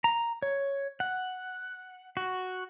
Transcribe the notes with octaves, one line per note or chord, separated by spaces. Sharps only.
A#5
C#5
F#5
F#4